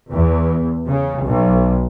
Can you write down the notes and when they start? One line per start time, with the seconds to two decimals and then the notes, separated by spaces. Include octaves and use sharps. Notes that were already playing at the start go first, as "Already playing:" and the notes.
0.11 E2
0.87 C#3
1.24 B1